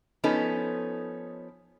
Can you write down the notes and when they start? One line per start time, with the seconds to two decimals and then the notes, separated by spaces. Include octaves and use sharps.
0.24 F3 B3 C#4 D#4 A4